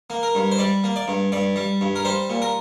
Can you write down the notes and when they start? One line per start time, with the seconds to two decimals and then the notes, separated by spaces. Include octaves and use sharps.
0.10 A#3
0.23 A#4
0.35 G2
0.52 C5
0.59 G3 D5
0.84 A#3
0.96 D5
1.08 G2
1.32 G2 D5
1.56 G3
1.81 G2
1.96 A#4
2.05 G3 C5
2.30 A#2
2.42 A#4